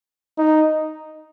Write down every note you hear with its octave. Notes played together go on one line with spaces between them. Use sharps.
D#4